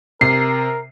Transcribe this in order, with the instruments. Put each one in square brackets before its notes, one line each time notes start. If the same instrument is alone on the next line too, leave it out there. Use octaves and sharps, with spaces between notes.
[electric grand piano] C3 [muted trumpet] A#4 [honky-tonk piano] C7